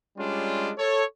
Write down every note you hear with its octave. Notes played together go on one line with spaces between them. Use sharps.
G3 G#3 C#4 D4 F4
A4 C#5